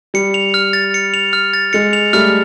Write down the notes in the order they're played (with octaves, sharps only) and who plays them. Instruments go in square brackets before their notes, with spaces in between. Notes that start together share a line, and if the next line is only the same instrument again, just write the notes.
[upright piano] G3 [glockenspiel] C#7
[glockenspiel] F7
F6
A6
C#7
F7
F6
A6
[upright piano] G#3 [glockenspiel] C#7
[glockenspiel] F7
[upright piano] G3 A3 [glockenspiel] F6